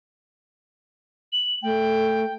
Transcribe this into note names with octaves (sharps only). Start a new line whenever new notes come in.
F#7
A3 G5